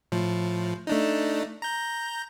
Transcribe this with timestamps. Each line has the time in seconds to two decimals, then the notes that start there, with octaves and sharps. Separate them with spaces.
0.12 A2 F3
0.87 A3 D4 D#4
1.62 A#5 G6